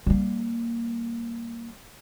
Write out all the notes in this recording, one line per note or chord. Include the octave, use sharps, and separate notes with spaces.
G3 A#3